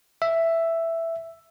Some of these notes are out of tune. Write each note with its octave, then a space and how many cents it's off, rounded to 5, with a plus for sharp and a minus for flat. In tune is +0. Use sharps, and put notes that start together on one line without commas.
E5 +5